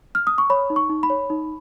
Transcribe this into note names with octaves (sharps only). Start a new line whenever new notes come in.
F6
D#6
C#6
C#5 B5
D#4
C#6
D#4
B5
C#5
D#4